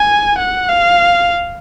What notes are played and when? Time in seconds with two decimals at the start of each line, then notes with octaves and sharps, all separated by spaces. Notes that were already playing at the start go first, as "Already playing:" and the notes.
Already playing: G#5
0.38 F#5
0.69 F5